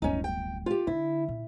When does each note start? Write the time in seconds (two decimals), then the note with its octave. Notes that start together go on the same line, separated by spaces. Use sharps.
0.02 D1 G1 C#4 D#4
0.24 G5
0.66 F4 G4
0.87 D3 E4
1.28 A#2